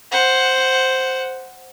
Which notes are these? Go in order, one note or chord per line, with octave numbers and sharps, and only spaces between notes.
C5 F#5